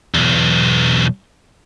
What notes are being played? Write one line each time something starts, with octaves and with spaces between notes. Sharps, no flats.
B1 E2